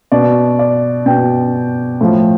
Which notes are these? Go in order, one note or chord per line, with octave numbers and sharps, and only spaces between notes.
B2 D5
D5
B2 G5
A2 F3